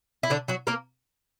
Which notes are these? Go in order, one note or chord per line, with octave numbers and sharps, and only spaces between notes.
E4
D3 D4
F#3 F#4
A#3 A#4